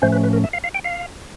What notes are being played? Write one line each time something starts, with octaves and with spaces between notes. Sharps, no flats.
A2 F3 A3 C#4 C5
B4
B4
A#4
E5
F5
F5
G5
F5